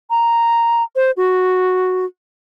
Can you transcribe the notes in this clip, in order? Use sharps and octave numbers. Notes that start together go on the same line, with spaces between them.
A#5
C5
F#4